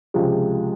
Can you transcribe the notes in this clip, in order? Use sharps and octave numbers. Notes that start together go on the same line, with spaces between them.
C#2 C3 F3 G#3